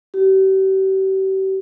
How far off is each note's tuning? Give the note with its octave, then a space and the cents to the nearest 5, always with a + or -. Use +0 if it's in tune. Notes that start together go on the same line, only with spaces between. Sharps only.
G4 -40